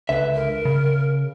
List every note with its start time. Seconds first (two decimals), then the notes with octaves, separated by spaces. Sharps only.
0.09 C#2 D3 B4 E5
0.35 A#4
0.65 C#3